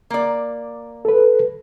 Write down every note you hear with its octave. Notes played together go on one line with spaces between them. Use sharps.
A#3 D5
A4 B4